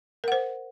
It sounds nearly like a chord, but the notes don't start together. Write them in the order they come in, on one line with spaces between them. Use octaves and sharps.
A#4 F#5 C5